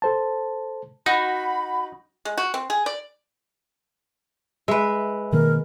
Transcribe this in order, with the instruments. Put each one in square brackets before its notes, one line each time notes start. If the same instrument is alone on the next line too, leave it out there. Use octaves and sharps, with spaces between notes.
[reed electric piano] A4 C5 A5
[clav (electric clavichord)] D#4 [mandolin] F#4 [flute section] B5
[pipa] G#3
F#4
C4
G#4
D5
[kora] G#3 B4 [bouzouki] E5
[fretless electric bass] B2 D#3 A#3 [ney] A#4